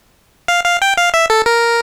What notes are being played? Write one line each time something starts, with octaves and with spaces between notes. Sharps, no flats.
F5
F5
G5
F5
E5
A4
A#4